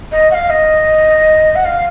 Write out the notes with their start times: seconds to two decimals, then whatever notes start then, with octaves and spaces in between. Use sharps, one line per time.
0.12 D#5
0.31 F#5
0.34 F5
0.50 D#5
1.56 F#5
1.65 F5